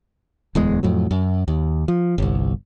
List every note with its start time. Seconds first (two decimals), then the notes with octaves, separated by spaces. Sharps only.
0.55 D1 E2 G#3
0.83 F2 A2 F#3
1.11 F#2
1.48 D#2
1.88 F3
2.18 G1 C2